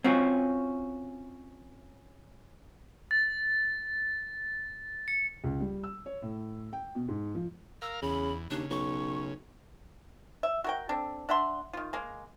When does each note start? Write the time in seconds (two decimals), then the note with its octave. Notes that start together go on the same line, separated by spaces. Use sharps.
0.04 C4 C#4 F4 F#4
3.11 A6
5.08 C#7
5.44 C#2
5.60 G3
5.83 E6
6.06 C#5
6.22 A2
6.73 G5
6.95 B2
7.08 G#2
7.35 F3
7.82 A#4 F5 E6
8.02 E2 C#3 B5
8.50 D#2 C#3 D4
8.70 B1 C#6
10.43 E5
10.64 F#4 A#4 G5
10.89 C4 D4 A4
11.29 D4 E5 F#5 C6
11.73 D#3 F4
11.93 G#3 A#3